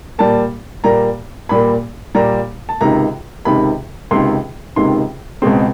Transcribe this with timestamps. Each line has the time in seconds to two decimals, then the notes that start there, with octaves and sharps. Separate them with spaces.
0.19 A#2 G3 A#3 A5
0.84 A#2 G3 A#3 A#5
1.49 A#2 G3 A#3 B5
2.15 A#2 G3 A#3 A#5
2.69 A5
2.81 C#2 C3 D#3 A#5
3.45 C#2 C3 D#3 B5
4.11 C#2 C3 D#3 C6
4.76 C#2 C3 D#3 C6
5.42 C#2 B2 G#3 C4 C6